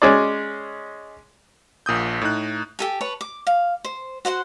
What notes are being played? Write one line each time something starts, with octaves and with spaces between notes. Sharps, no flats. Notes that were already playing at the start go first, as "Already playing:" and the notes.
G#3 C#4 G#4 D5
A#1 A#2 D#6 G6
A2 D#4 F#6
G4 A4 G#5
B4 C#5 A5
D6
F5
C5
F#4 C5 F#5 C6